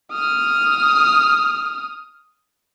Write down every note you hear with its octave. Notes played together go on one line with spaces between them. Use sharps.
D#6 F6